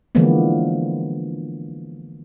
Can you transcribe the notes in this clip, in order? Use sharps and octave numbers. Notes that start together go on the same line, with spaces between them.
D3 E3 F3 G#3 A#3 B3